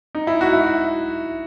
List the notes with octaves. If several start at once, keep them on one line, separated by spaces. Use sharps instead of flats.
D#4
E4
F#4
E4